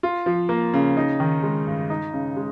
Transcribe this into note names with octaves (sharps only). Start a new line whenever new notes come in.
F4
F3
A#3
C#3
D#4
D#3
G#3
G2
D#4
C#3
G#3